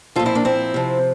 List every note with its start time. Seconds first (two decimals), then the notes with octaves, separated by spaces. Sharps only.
0.16 A#2 F3 F4 A4
0.26 C4 E4
0.35 A#3 D4
0.45 C4 E4
0.74 C3 F3